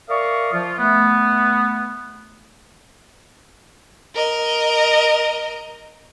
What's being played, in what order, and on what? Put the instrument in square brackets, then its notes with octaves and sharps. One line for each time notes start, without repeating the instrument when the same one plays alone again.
[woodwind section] A#4 D5 E5 F5 C#6 D#6
F3 F4
A3 B3
[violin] A#4 D#5